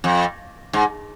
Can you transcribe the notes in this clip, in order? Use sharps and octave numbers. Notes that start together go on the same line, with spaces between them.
F2
G#2